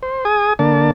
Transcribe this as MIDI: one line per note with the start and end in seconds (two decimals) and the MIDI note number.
0.03 0.24 72
0.25 0.53 68
0.25 0.53 80
0.25 0.53 87
0.59 0.91 50
0.59 0.91 58
0.59 0.91 74
0.59 0.91 81